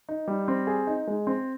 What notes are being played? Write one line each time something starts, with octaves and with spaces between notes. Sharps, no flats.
D#4
G3
C4
G#4
D#4
G#3
C4